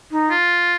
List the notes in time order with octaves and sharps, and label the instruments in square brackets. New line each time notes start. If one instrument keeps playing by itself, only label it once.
[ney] D#4
[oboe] F4